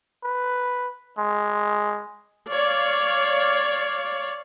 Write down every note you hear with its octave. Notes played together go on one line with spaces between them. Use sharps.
B4
G#3
C#5 D5 F5